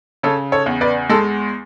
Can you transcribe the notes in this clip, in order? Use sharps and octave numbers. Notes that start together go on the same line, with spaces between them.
C#3 A4 C#5
A4 C#5
E2
B4 D5
G#3 A4